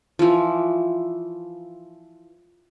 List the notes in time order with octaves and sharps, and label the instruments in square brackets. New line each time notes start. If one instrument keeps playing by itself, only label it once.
[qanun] E3 F3